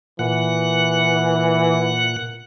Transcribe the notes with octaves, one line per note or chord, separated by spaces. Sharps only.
A#2 E3 F#5